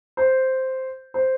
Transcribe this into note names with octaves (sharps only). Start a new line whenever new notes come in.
C5
C5